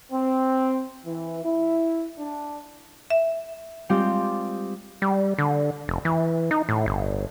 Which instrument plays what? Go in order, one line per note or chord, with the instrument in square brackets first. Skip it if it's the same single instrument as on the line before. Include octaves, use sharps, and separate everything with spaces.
[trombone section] C4
E3
E4
D4
[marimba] E5
[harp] G3 G#3 C4 F4 G4
[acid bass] G3
D3
F1
E3
D#4
A2
G1